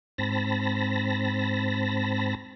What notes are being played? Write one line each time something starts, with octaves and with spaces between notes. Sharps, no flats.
G#2 C4 A5 B5 A#6